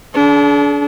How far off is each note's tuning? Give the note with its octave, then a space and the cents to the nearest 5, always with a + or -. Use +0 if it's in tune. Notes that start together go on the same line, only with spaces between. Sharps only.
D4 -30 G#4 +45